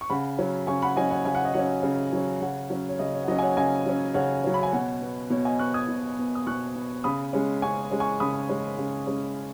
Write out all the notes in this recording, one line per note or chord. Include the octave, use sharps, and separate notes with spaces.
C#6
C#3 F#5 B5
F#3 C#4
C#3 G#5 C#6
F#5 B5
F#3 C#4 D#5 G#5
C#5 F#5
C#3 G#5
F#5
D#5
F#3 C#4 C#5 F#5
C#3
F#3 C#4
C#3 C#5 F#5
F#3 C#4
C#5
C#3 D#5
C#5
F#5
F#3 C#4 D#5
G#5
C#5 F#5
C#3 D#5 G#5
F#3 C#4
C#3 C#5 F#5
F#3 C#4
B5
G#5
B2 C#5 F#5
B3
B2 C#5
D#5 G#5
B3 C#6 F#6
D#6 G#6
B2
B3
D#6
B2 C#6 F#6
B3
C#3 B5 D#6
G#3 C#4
C#3 G#5 C#6
G#3 C#4
G#5 C#6
C#3 B5 D#6
G#3 C#4
C#3
G#3 C#4